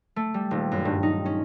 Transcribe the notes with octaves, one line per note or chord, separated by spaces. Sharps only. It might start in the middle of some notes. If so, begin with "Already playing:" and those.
A3
G3
D#1
F#2
G2
D#4
C#4